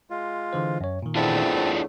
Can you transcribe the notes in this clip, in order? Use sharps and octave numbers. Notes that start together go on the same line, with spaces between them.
G#3 F4
D3 E3 C5
F#2 C#5
A#2 D#3
E2 A3 C4 D4 E4 F4 A5
C#5